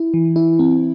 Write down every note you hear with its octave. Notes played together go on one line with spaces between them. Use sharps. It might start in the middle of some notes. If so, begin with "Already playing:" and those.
Already playing: E4
E3
E4
C4